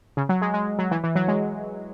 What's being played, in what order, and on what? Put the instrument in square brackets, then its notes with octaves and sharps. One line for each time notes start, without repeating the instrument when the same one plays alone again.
[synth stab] C#3
F#3
G#3
G#3
F#3
E3
E3
F#3
G#3